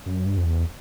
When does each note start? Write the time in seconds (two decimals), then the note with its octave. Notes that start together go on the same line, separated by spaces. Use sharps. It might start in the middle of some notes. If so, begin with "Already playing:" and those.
0.06 F#2
0.26 G2
0.37 F2
0.45 E2